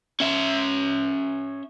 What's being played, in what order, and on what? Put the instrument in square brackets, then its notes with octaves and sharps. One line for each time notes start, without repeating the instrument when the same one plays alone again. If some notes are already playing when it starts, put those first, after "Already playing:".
[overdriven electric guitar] C#4 E5